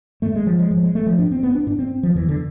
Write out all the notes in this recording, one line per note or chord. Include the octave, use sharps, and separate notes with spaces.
G#2 A3
G#3
F3
G#3
G#2 F3
G#3
A3
F3
G#2 D4
C4
B3
D4
G#2 D4
C4
F3
E2 E3
D3